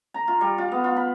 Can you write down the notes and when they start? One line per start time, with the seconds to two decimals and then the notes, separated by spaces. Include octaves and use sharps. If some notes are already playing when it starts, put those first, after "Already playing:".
0.14 A#5
0.28 F4
0.41 G3
0.58 F4
0.72 B3
0.84 F4
0.97 B5